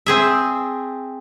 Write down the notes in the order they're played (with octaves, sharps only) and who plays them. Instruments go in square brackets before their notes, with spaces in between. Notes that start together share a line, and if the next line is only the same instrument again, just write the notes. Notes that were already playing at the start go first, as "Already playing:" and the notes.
[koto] C4 G#4 E5